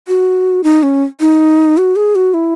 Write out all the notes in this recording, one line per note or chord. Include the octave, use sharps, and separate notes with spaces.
F#4
D#4
C#4
D#4
F#4
G#4
F#4
E4